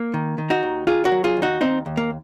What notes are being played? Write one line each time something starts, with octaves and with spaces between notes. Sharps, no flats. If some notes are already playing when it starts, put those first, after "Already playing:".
Already playing: A#3
D#3
D#3
D#4 F#4
D#2
D#2 F4 G#4
F#4 A#4
F#3
F4 G#4
D#2
D#4 F#4
D#2 C4 D#4
D#2
A#3